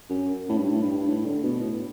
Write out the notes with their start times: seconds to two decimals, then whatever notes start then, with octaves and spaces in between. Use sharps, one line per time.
0.10 F#2
0.49 A2
0.58 G2
0.71 A2
0.83 G2
1.07 A2
1.25 D3
1.43 B2
1.62 A2